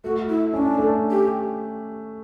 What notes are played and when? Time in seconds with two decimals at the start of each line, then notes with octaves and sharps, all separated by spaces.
0.04 A3 F#4
0.29 E4
0.54 C#4 D4
0.78 A3
1.10 G4